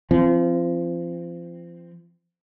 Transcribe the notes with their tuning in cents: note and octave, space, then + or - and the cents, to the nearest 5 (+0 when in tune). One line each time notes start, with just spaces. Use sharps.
F3 -30 C4 +0